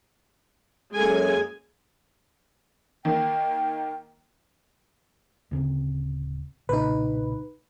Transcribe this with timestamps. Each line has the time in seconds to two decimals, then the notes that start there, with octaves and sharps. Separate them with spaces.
0.95 F#2 G#3 A#3 A4 G#5
3.05 D#3 A#3 G5
5.51 D1 C#3 C4
6.69 B1 A#2 C#3 D#4 B4